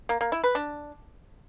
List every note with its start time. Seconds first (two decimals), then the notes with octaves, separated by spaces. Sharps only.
0.09 A#3
0.21 A#3
0.32 E4
0.44 B4
0.55 D4